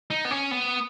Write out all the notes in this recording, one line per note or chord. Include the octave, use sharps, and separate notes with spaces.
D#4
B3
C#4
B3